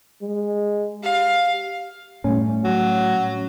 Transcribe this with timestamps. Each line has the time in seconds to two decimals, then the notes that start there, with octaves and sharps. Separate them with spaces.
0.22 G#3
1.03 G4 F5
2.24 A2 G3 A3 C#4
2.64 F#3